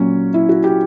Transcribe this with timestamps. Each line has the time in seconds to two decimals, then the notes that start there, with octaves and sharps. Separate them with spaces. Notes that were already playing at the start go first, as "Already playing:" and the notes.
Already playing: A#2 F#3 C#4
0.34 E4
0.49 F#4
0.64 G4